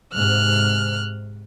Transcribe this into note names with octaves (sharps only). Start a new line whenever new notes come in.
G#2 C3 F6 F#6